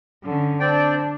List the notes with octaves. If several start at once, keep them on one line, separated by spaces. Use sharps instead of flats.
D3 C#4
C4 D4 D5 G5